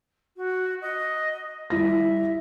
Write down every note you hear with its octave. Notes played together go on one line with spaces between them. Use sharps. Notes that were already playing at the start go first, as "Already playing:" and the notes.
F#4
D#5
G3 E4 E5 A#6